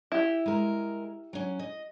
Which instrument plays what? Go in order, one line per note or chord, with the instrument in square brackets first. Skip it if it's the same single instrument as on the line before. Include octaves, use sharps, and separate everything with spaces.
[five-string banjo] E4 G4
[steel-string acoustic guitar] G#3 A#4
F#3 C#4
D#5